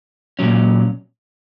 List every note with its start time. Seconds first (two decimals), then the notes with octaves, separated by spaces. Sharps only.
0.39 A#2 F#3 C#4